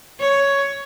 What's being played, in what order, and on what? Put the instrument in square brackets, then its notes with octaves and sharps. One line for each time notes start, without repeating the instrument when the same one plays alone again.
[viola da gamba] C#5